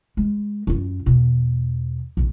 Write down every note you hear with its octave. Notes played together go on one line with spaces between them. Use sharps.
G#3
F#2 F4
E2 B2
A#1 F2